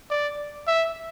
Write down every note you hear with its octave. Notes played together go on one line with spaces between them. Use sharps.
D5
E5